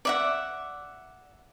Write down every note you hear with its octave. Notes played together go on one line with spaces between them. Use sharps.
D5 E5 F#5